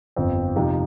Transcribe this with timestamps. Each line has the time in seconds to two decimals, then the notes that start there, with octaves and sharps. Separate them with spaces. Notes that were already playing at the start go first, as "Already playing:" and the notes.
0.16 G1 F2 F3 C4
0.56 F2 C3 F3 D#4 G4